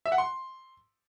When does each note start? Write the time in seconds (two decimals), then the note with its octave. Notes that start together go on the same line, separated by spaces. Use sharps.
0.06 E5
0.12 F#5
0.18 C6